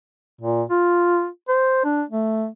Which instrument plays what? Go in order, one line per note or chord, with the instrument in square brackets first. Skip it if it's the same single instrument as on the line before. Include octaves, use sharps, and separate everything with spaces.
[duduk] A#2
F4
C5
D4
A3